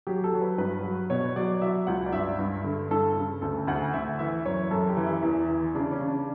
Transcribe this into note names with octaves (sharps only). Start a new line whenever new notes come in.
F#3 G4
A4
F#3
B4
G2 B4
F#3
B2 C#5
F#3 D5
F#3 E5
C#2 F#5
D5
G2 E5
G2
D3
G2 A4
C#3
D2 A4
D2 F#5
D2 E5
E3 E5
F#2 C#5
F#2 A4
G4
E3
E4
E2
E3
C#3 D4
C#4
C#3
D4